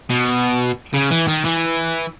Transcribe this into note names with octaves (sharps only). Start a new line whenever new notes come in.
B2
C#3
E3
D#3
E3